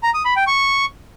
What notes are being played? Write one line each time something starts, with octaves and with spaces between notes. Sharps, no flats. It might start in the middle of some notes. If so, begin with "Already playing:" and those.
A#5
D#6
B5
G5
C#6